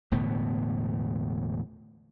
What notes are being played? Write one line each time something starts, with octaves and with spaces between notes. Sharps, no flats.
E1 A2 D3 B3